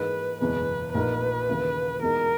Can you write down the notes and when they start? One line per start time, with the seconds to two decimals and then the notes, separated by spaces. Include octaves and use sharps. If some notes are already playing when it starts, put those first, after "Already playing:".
Already playing: G#2 E3 A#3 D#4 G#4 B4
0.40 F#1 E2 B2 G#3 B4
0.94 A#1 A#2 A#3 D#4 A#4 B4
1.48 D#2 C#3 E3 A#3 E4
2.02 E2 B2 G#3 D#4 F#4 A#4